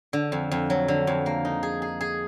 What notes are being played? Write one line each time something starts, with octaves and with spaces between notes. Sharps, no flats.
D3
F2
F2
F#3
D3
F2
A#3
D#4
G#4
G#4
G#4